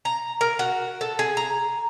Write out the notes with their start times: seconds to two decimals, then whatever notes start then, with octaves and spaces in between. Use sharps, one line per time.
0.05 A#5
0.41 A#4
0.59 F#4
1.01 A4
1.19 G#4
1.37 A#5